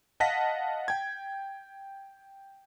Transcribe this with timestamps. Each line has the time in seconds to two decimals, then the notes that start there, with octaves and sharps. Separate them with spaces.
0.20 D#5 F5 F#5 A5 A#6 B6
0.88 G5 G#6